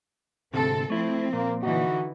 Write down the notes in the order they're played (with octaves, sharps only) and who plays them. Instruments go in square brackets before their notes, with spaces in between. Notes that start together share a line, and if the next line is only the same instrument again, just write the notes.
[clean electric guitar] D2 G#2 C3 [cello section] C4 A4
[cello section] F3 C4 [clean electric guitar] A3 E4
[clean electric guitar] A#2 [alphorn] A#3
[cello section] D3 E3 D#4 [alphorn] F#4